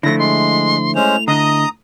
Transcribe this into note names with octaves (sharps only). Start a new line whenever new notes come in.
D3 F3 A3 E4 A#6
G#3 C6
G#3 C#4 C5 F7
D3 D#5 A#5 D#6